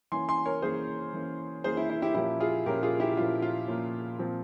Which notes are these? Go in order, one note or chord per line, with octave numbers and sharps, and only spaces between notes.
E3 A#3 C#4 G#5 C6
G#5 C6
A#4 C#5
E3 A#3 C#4 G#4 C5
E3 A#3 C#4
E3 A#3 C#4 G#4 C5
E4
E4
E4 G4
A#2 F3 A#3 C#4 E4 G4
F4 G#4
A#2 F3 A#3 C#4 G4 A#4
F4 G#4
E4 G4
A#2 F3 A#3 C#4 F4
F4
A#2 F3 A#3 C#4
A#2 F3 C4